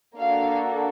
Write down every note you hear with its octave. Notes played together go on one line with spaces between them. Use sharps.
A#3 D4 F#4 A4 F5